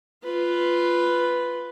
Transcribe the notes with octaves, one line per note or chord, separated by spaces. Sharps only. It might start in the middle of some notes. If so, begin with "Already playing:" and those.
F4 B4